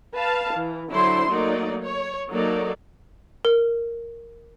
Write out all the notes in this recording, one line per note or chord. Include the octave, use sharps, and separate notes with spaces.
B4 F5 A5
E3
D3 F#3 D4 E4 C5 C6
F#3 A3 A#3 D#4 D5
C#5
F#3 A#3 D#4 A4 D5
A#4